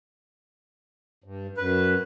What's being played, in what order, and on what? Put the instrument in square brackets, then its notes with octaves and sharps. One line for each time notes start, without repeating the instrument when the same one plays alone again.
[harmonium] G2
[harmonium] F#2 [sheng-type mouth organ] B4